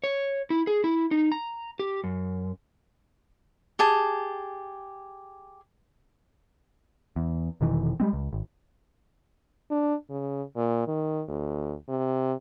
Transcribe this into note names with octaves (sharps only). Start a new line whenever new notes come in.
C#5
E4
G#4
E4
D#4
A#5
G4
F#2
G4 G#4 A5
E2
F1 B2 D#3 E3
G3 G#3 C4
C#2
G#1
D4
C#3
A#2
D#3
D2
C3